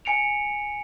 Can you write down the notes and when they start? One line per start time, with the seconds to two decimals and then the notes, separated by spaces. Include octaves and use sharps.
0.05 G#5 C#7 D7 F7